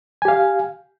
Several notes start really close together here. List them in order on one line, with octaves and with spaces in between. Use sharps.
G#5 G4 F5